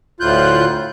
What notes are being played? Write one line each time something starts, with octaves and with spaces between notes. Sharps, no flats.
D2 A2 F4 F#6 G6